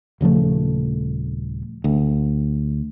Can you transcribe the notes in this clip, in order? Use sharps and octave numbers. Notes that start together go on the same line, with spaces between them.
D#1 C#3 F3 A3
D2